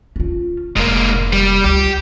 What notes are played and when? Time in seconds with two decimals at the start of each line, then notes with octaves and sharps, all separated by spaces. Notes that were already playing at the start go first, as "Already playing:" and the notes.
0.16 C#4 F4
0.76 F1 G#2 A#3
1.33 G3
1.64 C#2 G4